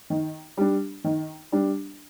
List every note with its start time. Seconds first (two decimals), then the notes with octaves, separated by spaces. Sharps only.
0.10 D#3
0.57 G3 D4
1.04 D#3
1.52 G3 D4